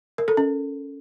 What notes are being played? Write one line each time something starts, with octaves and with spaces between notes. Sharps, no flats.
A#4
A4
C#4